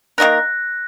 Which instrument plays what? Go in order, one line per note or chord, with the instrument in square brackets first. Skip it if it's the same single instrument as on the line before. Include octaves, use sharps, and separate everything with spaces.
[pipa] D#3 A#3 D#4 A#4 [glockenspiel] F#6 A#6